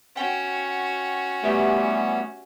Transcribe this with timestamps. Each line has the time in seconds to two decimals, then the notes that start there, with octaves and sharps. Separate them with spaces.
0.16 C#4 F#4 F#5 G5
1.44 E3 G3 A3 B3 G4 E5